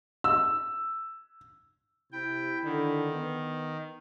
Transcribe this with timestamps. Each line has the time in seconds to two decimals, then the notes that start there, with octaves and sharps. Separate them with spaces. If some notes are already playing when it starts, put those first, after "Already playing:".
0.24 E6
2.12 C3 E4 G5
2.64 D3 D#3
3.12 B3